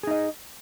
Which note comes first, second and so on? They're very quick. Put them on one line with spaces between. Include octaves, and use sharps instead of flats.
G#4 D#4 D#5